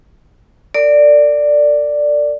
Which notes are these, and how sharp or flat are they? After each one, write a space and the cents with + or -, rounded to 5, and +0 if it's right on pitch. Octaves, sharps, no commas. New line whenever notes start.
A#4 -35 D5 +0